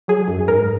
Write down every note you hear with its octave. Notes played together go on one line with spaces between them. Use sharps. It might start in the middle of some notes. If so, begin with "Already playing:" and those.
F#3 G#4
F#2
G#2 A#4